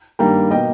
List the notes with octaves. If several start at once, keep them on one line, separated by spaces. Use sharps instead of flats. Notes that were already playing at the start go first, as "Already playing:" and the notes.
G2 D#3 G3 A#3 G5 A#5
B2 A#3 D#5 G5